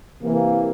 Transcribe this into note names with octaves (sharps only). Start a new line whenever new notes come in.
C3 E3 A#3